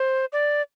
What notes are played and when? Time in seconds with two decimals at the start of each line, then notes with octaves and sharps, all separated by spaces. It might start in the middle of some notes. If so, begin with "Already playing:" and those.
Already playing: C5
0.33 D5